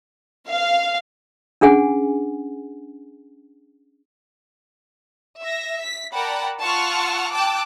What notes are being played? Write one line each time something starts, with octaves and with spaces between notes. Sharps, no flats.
F5
C#4 D4 G#4 F#5 G#5
E5 A#6
B6
A#4 D5 F#5 G5 A5 B5
F4 F#5 A5 C#6 E6 F6
G5 A5 D6 E6 F#6